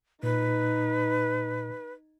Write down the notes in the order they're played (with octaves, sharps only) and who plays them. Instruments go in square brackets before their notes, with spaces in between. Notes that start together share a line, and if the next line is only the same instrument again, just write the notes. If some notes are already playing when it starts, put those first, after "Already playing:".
[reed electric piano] A#2 [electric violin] D#4 [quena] B4